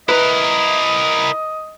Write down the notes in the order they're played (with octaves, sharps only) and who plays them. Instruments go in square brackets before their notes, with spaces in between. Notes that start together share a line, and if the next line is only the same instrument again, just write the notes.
[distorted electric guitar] E4 A#4 [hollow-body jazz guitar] B4 [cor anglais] D#5